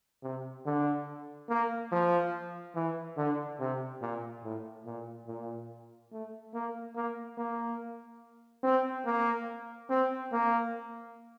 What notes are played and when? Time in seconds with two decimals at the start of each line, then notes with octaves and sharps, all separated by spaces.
0.23 C3
0.65 D3
1.49 A#3
1.92 F3
2.75 E3
3.17 D3
3.60 C3
4.01 A#2
4.44 A2
4.86 A#2
5.28 A#2
6.12 A3
6.54 A#3
6.96 A#3
7.37 A#3
8.63 C4
9.06 A#3
9.90 C4
10.32 A#3